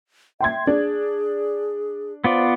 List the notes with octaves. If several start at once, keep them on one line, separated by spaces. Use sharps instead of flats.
E5 G5 C6 G#6
D4 G#4
B3 F4 C5 D5